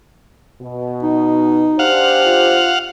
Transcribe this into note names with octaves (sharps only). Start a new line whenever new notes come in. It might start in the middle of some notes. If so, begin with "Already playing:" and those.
B2
D#4
D4 G4 C5 F5 F#5
F4